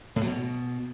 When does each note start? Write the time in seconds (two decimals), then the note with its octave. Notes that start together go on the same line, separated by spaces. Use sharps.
0.16 A2
0.21 F#3
0.27 B2